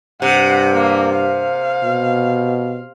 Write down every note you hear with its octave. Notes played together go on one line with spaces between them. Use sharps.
G2 C3 F#5
A#3
F5
B2